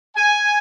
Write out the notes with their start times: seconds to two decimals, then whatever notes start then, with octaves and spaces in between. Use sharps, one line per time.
0.16 G#5